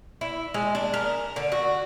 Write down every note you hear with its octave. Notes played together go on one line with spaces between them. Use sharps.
E4
G#3
D4
A#4
D3
F#4